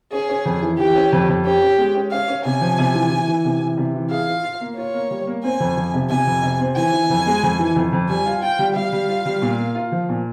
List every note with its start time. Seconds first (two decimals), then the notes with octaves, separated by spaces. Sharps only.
0.13 C#4 G#4
0.29 C#4
0.45 F2
0.62 E3
0.79 E3 G4
0.96 C#4
1.12 F2
1.28 F2
1.45 C#4 G4
1.62 C#4
1.78 G#3
1.95 C#4
2.11 C#4 F5
2.28 C#4
2.45 C3 G#5
2.61 F3
2.79 C3
2.94 E3
3.11 E3
3.28 E3
3.44 C3
3.61 E3
3.77 C3
3.94 E3
4.11 G#4 F5
4.27 F4
4.43 F4
4.60 A#3
4.77 F4 C#5
4.94 A#3
5.11 G3
5.27 A#3
5.44 C4 G#5
5.60 F2
5.77 F3
5.94 C3
6.10 C3 G#5
6.27 F2
6.43 C3
6.60 C4
6.76 E3 G#5
6.93 E3
7.10 F2
7.26 G#3
7.43 F2
7.59 E3
7.76 F2
7.92 F2
8.09 G3 G#5
8.26 F4
8.43 F4 G5
8.59 G3
8.75 G3 F5
8.92 G3
9.09 F4
9.26 G3
9.42 A#2
9.59 A#3
9.75 F4
9.92 F3
10.09 A#2